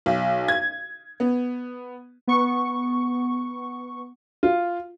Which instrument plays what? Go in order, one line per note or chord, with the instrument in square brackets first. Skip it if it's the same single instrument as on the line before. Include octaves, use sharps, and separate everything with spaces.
[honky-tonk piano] B1
G#6
B3
[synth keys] B3 C#6
[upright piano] F4